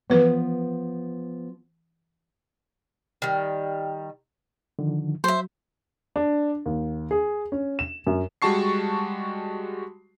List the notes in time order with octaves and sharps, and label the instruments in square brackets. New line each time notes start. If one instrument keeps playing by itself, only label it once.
[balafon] E3 B4 [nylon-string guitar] F3 B3
[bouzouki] D#3 G3
[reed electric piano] D3 D#3 F3
[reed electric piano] F#3 [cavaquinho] C5 E5
[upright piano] D4
D#2
G#4
C#4
E7
F#2
[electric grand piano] G3 G#3 F#4 A5 C#6 C7